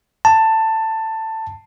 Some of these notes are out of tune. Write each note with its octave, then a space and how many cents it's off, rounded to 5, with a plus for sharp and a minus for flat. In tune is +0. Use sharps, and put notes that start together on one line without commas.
A5 +15